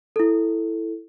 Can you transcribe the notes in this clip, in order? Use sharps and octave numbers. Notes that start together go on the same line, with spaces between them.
E4 A4